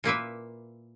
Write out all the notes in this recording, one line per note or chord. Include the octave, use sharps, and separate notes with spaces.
A#2 A#3 E4 B4 E5